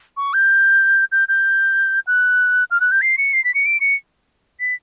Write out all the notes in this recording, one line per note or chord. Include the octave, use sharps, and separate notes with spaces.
C#6
G6
G6
G6
F#6
F6
F#6
G6
C7
C#7
C7
B6
C#7
D7
C#7
B6